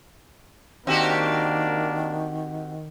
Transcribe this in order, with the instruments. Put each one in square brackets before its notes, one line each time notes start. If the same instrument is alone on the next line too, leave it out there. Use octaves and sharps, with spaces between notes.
[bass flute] D#3 [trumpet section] A#3 D4 [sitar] C4 F#4 G4